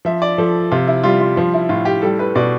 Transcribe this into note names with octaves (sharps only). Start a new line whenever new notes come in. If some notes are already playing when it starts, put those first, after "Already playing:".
F3 E5
D5
F3 A4
C3 F4
E4
G3 F4
F4
F3 F4
E4
A2 F4
G4
G3 A4
B4
B2 D5